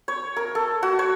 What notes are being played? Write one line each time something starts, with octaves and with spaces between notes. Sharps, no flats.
C#5
A#4
A4
F#4
C#5